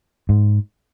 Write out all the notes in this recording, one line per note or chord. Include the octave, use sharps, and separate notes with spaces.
G#2